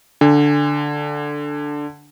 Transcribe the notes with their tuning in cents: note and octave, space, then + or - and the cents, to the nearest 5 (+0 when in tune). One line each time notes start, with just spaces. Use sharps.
D3 +0 G#5 -35